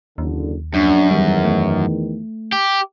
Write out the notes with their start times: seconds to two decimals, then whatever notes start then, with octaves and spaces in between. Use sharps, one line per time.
0.18 F#1 D#2 D3
0.74 A#1 F#2 D4
1.11 E2 D#3 G3
1.45 A3
2.52 G4